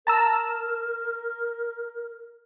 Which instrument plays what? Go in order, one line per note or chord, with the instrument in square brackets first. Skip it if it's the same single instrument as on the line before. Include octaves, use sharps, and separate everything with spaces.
[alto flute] A#4 [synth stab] A5 A#5 E6